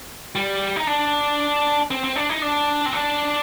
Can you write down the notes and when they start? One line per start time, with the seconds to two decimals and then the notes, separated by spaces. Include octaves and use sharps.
0.36 G3
0.76 D#4
0.87 D4
1.91 C4
2.04 C4
2.16 D4
2.29 D#4
2.42 D4
2.86 C4
2.93 D4